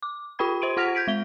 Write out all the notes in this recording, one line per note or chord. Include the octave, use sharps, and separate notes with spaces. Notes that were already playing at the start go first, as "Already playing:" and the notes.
D6
F4 G4 G5 B5 G#6
C5 C6 D7 D#7
F4 F#5 F6 A#6 B6 F7
G6 G#6 B6 D7
G#3 G7